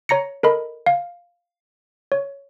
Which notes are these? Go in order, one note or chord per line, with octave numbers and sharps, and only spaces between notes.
C#5 A#5 A#6 C#7
A4 A#4 D#5 B5
F5
C#5